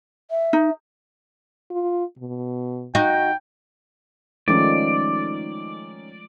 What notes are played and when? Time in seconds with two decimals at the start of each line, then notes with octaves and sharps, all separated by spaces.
0.31 E5
0.53 D#4
1.71 F4
2.19 B2
2.95 D#4 F#4 G5
4.48 D#3 F3 G#3 A3 C#4 D#4 D5